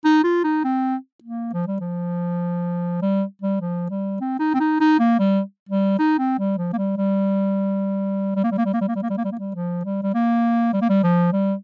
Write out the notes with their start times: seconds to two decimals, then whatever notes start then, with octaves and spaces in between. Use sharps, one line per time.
0.05 D#4
0.24 F4
0.44 D#4
0.64 C4
1.24 A#3
1.53 F3
1.67 G3
1.81 F3
3.02 G3
3.42 G3
3.61 F3
3.90 G3
4.21 C4
4.40 D#4
4.54 C4
4.60 D#4
4.81 D#4
5.00 A#3
5.19 G3
5.69 G3
5.99 D#4
6.19 C4
6.39 G3
6.58 F3
6.73 A#3
6.78 G3
6.98 G3
8.36 G3
8.44 A#3
8.52 G3
8.58 A#3
8.66 G3
8.74 A#3
8.81 G3
8.88 A#3
8.96 G3
9.03 A#3
9.10 G3
9.18 A#3
9.25 G3
9.32 A#3
9.39 G3
9.55 F3
9.85 G3
10.03 G3
10.15 A#3
10.73 G3
10.82 A#3
10.90 G3
11.04 F3
11.33 G3